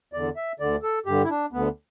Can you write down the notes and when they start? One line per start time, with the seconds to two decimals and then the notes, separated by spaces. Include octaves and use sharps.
0.13 E2 D3 D5
0.36 E5
0.60 D2 D3 D5
0.83 A4
1.06 G2 D3 G4
1.24 E4
1.30 D4
1.52 D2 D3 B3